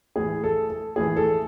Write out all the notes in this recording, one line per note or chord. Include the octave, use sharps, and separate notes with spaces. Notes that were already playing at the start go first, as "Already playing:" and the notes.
A2 E3 G#4
A4
A4
A2 E3 G#4
A4